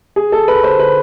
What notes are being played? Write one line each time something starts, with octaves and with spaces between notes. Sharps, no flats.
G#4
A4
B4
C5
B4